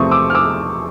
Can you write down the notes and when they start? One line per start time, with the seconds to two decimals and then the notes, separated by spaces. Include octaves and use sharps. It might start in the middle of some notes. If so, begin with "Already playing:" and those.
Already playing: E2 C3 F3 A3 C4 C#6 D#6
0.11 D6 E6
0.30 F6
0.35 D6 E6